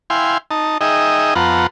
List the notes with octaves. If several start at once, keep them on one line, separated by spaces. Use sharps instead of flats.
E4 F5 G5 G#5 C6
D#4 A5
D#4 G#4 D#5 E5 G5
F2 B3 F4 F#5 A5 A#5